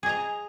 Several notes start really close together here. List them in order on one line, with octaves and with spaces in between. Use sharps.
G#4 D#5 A#5